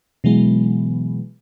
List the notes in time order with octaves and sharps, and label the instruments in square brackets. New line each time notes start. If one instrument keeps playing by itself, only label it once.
[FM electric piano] B2 E3 F#3 G#3 B3